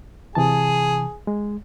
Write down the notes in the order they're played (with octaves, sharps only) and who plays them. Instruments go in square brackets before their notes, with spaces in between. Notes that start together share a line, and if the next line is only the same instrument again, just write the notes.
[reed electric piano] C3 E3 A5 [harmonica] G#4
[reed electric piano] G#3